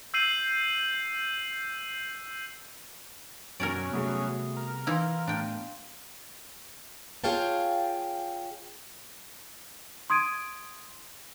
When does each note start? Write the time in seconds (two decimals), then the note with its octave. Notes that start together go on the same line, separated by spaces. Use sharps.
0.14 E6 G6 C7 D#7 F#7
3.60 F#2 B2 F#3 C#4 A#4 C#5 D5
3.93 C3 G3 A3 B3 F#4 G#4
4.57 A#4
4.87 E3 D#4 E4 F5 C6
5.27 A2 B3 D4 G5
7.24 F4 G#4 C#5 F5 G5 A5
10.10 C6 D#6 G#6 D7 D#7